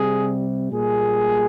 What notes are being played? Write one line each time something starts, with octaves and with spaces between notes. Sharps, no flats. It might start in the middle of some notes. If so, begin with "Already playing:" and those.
Already playing: C3 G3 G#4
A#2 G3 G#4